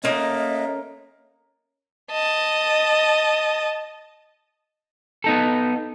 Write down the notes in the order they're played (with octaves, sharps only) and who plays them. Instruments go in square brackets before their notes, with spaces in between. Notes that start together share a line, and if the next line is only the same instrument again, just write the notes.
[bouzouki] A3 A#3 D#4 [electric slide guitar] C#4 A#4 [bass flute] D#5
[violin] D#5 A5
[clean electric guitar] B3 D#4 A4